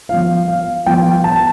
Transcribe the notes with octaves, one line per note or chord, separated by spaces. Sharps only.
F3 B3 F4 F5
F5
F3 B3 F4 G5
A5